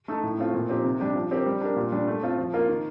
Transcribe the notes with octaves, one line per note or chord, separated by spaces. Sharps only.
A3 D#4 A4
A2
A3 C4 F4
A#2
F3 C4 D#4 G4
C3
G3 D4 G4
F3
C4 G4 A#4
G3
D4 G4 A#4
A#2
G3 D4
A3
C4 F4 A4
F3
A#3 F4 A#4
D#3